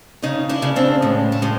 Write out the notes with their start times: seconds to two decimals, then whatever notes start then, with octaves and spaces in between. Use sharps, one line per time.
0.22 C#3 C#4 D#4
0.49 D4 E4
0.62 C#3
0.76 C4 D4
1.02 A2 G#3
1.32 A3
1.42 A2 G#3